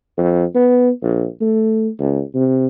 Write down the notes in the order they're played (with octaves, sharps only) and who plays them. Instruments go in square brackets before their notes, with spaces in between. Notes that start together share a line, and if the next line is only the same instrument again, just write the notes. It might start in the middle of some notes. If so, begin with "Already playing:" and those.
[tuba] F2
B3
A#1
A3
C#2
C3